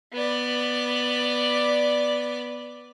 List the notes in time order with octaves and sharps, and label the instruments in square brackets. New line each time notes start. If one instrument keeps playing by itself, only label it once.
[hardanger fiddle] B3 D5